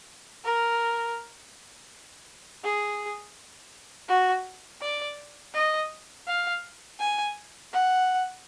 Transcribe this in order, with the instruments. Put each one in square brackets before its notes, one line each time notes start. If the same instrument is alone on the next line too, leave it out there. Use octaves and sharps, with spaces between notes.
[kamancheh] A#4
G#4
F#4
D5
D#5
F5
G#5
F#5